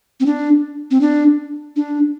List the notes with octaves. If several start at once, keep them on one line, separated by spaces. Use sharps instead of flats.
C4
D4
C4
D4
D4